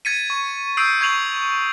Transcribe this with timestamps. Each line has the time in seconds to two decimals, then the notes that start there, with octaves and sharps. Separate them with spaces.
0.05 G#6 A6 B6 C#7 D#7
0.30 C#6
0.77 D#6 E6 G6 C7 D7
1.01 C#6 G#6 C7 F7 F#7